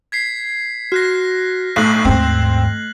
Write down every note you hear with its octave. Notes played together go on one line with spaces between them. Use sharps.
G#6 B6 C7
F#4 F6 F#6 A#6
B1 A2 A3 F#6 C7 F#7
D#2 G#2 C4